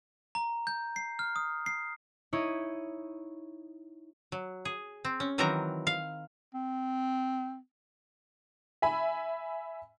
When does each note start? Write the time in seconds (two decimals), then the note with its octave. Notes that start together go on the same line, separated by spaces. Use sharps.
0.35 A#5
0.67 G6
0.96 C7
1.19 F6
1.36 D#6
1.66 C7
2.33 D#4 E4 C#5
4.32 F#3
4.65 G#4
5.05 C4
5.20 C#4
5.38 D#3 E3 F#3 C4 A#4 A#5
5.87 F5
6.54 C4
8.82 E5 G#5 B5